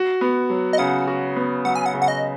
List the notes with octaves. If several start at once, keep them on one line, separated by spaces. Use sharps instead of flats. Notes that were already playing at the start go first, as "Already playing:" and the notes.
Already playing: F#4
B3
F#3
D#5
C#3 F#5
F#4
B3
F#3 F#5
G#5
F#5
C#3
F#5
D#5